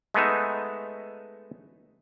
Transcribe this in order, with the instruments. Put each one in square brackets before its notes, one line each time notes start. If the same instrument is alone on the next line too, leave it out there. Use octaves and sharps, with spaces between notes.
[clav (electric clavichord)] G#3 A3 B3 D#4 E5